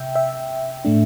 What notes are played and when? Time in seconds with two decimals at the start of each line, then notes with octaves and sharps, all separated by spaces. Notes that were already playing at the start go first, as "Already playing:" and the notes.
Already playing: C3 E5 G5
0.16 E5
0.85 A2 A3 D4